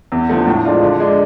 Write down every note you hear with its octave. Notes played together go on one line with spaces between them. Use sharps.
E2
D3 F3 A3
A2
F3 G#3 D4 F4
D3
G#3 D4